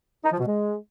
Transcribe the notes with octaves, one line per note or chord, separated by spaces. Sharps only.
D#4
F3
B2
G#3